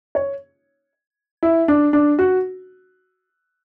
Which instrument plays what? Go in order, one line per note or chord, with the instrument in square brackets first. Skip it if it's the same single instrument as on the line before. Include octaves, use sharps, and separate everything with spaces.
[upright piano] C#5
E4
D4
D4
F#4